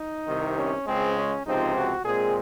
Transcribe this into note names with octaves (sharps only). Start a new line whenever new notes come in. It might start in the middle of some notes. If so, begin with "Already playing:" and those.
Already playing: D#4
C2 C3 D#3
C#4
C#2 C#3 G#3 C4
C#4
C#2 C3 F3 C4 D#4
F#4
A#2 G#3 C4 G#4